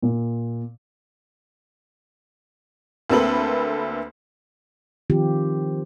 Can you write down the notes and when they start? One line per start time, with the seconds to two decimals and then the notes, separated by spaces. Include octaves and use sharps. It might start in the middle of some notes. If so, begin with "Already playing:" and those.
0.02 A#2
3.10 D2 A#3 C4 A4 B4 F#7
5.10 D#3 F3 C4 F4 G4